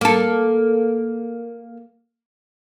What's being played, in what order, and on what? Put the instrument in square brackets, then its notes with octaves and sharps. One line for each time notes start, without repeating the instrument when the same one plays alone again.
[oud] A#3 A4